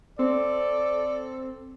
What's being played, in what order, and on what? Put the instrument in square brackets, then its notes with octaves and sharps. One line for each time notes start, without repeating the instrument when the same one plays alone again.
[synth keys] C4 [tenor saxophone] A4 [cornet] D5